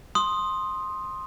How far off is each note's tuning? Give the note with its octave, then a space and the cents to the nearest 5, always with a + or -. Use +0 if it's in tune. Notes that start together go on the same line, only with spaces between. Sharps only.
C6 +10 D#6 +0